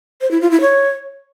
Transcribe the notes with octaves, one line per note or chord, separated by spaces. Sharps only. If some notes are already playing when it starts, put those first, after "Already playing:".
C5
E4
F4
E4
C#5